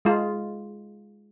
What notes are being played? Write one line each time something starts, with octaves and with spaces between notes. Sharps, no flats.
G#3 F4